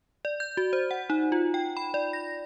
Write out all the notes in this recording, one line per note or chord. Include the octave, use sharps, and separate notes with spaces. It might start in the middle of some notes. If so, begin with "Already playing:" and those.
D5
G6
F#4
C5
F#5
D#4
F4
G5
B5
D5
A#6